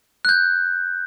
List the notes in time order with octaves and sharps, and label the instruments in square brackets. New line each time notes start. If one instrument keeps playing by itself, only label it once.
[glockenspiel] F#6 G6